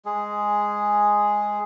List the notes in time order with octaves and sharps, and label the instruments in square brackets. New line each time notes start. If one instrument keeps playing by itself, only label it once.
[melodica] G#3 G#4